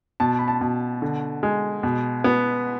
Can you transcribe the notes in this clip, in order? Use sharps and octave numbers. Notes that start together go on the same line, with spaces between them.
B2 A5
B5
A5
B2
D3
G#3
B2
B3